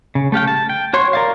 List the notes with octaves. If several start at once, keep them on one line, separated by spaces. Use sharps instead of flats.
C#3
A3 G4 F5 G5
A5
G5
F#4 C#5 C6 C#6
A#4 D5 F5